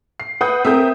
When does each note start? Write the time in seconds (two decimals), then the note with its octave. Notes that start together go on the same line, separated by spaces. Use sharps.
0.20 C7
0.41 B4 F#5 D#6 G6
0.65 C4 A4 A#4 E5 D#6 G6